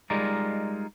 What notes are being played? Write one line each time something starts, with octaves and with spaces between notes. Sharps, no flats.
G3 G#3 D#4 F4 A#4 D5